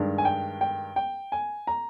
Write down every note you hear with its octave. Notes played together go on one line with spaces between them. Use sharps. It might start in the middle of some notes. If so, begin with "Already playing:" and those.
Already playing: G2 D#3 G#3 D4
G#5
G5
G5
G5
G#5
A#5